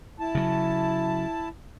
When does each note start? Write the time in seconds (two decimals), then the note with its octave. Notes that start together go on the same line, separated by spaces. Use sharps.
0.20 E4 A5
0.35 C#3 F#3